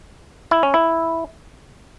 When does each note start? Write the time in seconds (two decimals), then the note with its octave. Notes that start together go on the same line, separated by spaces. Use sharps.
0.51 E4
0.63 C#4
0.74 E4